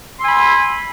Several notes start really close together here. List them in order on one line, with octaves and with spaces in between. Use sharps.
C6 E6 G#5 B5